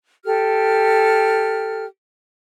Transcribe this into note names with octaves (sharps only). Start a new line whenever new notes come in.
G4 A4 F6